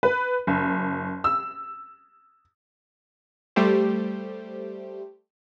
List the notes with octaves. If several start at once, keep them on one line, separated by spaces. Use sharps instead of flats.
B4
F#1
E6
G3 A3 G4 C5